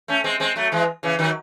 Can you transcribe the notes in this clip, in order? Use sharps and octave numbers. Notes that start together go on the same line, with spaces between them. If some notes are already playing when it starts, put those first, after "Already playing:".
A3 C#4
G#3 C4
G#3 C4
F#3 A3
E3 G#3
C#3 E3
D#3 F#3